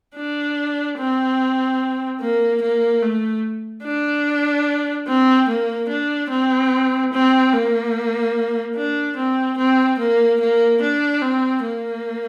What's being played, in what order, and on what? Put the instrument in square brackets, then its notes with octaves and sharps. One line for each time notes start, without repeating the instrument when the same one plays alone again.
[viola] D4
C4
A#3
A#3
A3
D4
C4
A#3
D4
C4
C4
A#3
D4
C4
C4
A#3
A#3
D4
C4
A#3